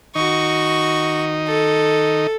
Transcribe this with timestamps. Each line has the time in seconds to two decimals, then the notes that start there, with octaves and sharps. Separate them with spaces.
0.15 D#3 D#4 F#4 C#6
1.47 A4